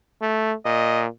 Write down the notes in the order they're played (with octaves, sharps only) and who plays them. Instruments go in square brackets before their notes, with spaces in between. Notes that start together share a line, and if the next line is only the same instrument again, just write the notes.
[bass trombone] A3
[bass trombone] A#2 [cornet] D#5